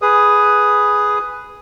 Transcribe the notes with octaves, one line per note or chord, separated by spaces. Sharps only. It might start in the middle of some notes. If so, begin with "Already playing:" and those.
G#4 B4 D#6